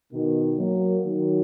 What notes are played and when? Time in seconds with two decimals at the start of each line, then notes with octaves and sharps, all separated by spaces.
0.11 B2 D#3
0.57 F#3 A#3
1.04 D#3 F#3